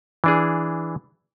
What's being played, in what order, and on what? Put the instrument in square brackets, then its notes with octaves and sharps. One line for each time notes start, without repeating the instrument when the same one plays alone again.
[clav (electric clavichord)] E3 D4 G#4